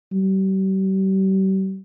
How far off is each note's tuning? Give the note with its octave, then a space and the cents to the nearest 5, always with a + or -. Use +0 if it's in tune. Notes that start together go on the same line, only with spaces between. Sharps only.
G3 -40